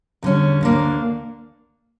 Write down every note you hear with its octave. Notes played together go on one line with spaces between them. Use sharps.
E2 D3 G3 C#4
D2 D3 A#3 D4